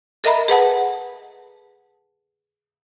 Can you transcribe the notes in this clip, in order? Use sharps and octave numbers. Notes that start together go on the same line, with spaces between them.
A4 A#4 D#5 E5 A#5 B5
G#4 B4 F#5 A5